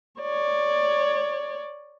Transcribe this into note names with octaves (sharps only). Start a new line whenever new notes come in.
C#5 D5